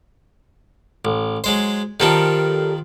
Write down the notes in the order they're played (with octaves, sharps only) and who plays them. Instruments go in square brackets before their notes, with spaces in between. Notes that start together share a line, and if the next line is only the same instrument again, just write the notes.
[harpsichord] A1
F#3 G#3 C5
[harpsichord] D#3 F3 C4 [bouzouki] G3 A4 A#4